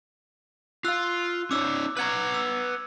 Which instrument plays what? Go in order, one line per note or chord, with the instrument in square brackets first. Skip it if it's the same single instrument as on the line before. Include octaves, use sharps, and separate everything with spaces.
[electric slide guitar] F4 F5 [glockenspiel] E6 F#6
[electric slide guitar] C#4 D#4 C#5 [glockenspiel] D6 E6
[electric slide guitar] B4 F#5 A#5 [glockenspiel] G#6 F#7
[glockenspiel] E6